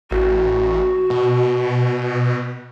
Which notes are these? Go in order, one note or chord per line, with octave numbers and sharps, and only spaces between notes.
A1 F#4
B2